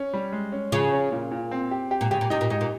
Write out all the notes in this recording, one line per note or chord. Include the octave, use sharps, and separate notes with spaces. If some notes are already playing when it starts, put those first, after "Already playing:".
Already playing: C#4
G3
G#3
C#4
C#3 F3
C#4
A#2
A#2
C4
G4
G4
A#2
C#3 G4
A#2
C3 D#4
A#2
G#2 D#4
A#2